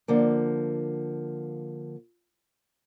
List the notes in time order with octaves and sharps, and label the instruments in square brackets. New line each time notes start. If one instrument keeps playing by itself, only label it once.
[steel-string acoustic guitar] D3 F3 A#3